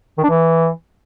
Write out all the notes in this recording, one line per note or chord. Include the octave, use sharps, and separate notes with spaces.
D#3
D4
E3